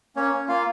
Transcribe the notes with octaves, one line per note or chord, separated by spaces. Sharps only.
A#3 C#4 C#5
C#4
A#3 F4 F5